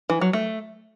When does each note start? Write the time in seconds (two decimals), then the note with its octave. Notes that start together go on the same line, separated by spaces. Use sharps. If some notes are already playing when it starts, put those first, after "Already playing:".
0.10 E3
0.21 F#3
0.33 A3